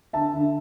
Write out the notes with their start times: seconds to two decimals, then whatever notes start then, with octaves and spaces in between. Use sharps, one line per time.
0.13 D3 E5 A5
0.34 D3